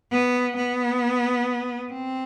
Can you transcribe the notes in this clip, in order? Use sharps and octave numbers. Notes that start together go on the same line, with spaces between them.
B3
B3
C4